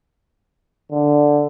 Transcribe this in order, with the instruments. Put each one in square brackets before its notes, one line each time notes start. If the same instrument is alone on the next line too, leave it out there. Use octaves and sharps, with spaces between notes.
[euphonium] D3